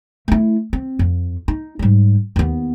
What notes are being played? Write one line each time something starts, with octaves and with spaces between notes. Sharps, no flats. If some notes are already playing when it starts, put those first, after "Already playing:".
A3 E4
C4
F2
D#4
G#2 G3
D#2 B3